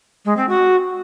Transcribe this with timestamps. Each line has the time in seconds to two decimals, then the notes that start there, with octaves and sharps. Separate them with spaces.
0.25 G#3
0.37 C4
0.49 F#4